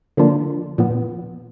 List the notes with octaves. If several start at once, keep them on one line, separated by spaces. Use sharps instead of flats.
D3 F3 A#3 D4 F4
A#2 F3 B3